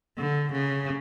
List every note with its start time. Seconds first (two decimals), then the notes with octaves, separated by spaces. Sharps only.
0.18 D3
0.52 C#3